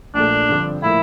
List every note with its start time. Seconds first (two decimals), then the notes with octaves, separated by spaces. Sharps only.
0.14 A#1 A#2 A3 D4
0.49 G2 D3 F3 C4 G4
0.82 A2 F3 A#3 E4